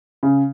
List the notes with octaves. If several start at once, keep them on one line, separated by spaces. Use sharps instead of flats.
C#3